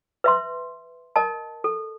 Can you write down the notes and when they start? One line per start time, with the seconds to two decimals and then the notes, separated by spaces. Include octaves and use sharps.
0.24 B4 E5 C6
1.16 A#4 D#5 A5
1.64 A4